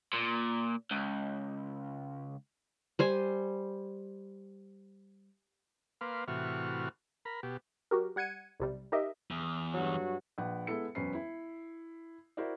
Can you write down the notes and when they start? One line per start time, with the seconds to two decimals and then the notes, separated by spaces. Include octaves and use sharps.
0.13 A#2
0.91 C#2
2.99 G3 C5 G#5
6.01 A#3 B4 F5 C6 D6
6.28 A2 C3 E3 F#4 C#6 F6
7.25 A#4 B5
7.43 B2 G4
7.91 F#3 F#4 G4 A#4
8.16 G3 F#5 G#6 C#7 D#7
8.60 B1 C3 G3
8.92 D#4 G4 A#4 D#5 E5
9.31 E2
9.74 G2 F#3 F#4
10.38 A#1 B4 F#5
10.67 G#3 B3 E4 A4 C#7
10.95 E1 F#2 C#4 B4 C5 C7
11.15 E4
12.37 E4 F#4 A#4 C5 D5